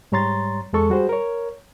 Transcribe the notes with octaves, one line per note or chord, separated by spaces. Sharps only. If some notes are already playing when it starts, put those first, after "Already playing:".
G#2 G3 C#5 A#5 C6 A6
E2 G#3 A4 C#6
G3 F#4 G#4 C5
A#4 C#5